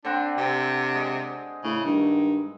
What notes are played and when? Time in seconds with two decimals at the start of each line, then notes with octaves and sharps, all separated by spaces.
0.05 D3 C4 D4 F#5
0.38 C3
0.95 G#3
1.64 A2 C#3
1.85 G2 D#3